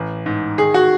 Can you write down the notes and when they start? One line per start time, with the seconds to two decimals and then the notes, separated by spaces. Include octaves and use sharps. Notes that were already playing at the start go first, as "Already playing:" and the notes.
Already playing: A1
0.26 G#2
0.58 D#3 G#4
0.74 F#4